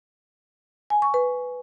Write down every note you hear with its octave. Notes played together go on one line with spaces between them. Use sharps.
G#5
C#6
B4